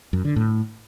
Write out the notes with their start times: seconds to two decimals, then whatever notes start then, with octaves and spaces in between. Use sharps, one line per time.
0.13 F#2
0.25 D3
0.36 A2